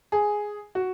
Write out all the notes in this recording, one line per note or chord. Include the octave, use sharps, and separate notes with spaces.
G#4
F#4